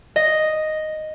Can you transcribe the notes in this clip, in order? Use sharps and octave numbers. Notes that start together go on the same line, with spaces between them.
D#5